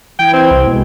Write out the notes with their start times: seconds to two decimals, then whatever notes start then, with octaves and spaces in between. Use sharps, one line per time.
0.19 E3 E4 G5 G#6
0.33 C4
0.51 C2
0.67 B2 G#3